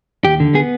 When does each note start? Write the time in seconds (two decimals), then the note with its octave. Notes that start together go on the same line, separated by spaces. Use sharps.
0.25 D#2 G4
0.40 D3
0.54 B3 G#4